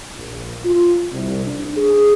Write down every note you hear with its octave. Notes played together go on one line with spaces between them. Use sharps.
A#1
F4
C2
D4
G#4